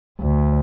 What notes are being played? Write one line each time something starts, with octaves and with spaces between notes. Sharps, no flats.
D2